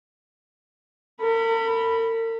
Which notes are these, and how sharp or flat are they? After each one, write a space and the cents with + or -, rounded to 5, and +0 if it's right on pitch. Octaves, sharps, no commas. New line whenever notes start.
A#4 -45 B5 -5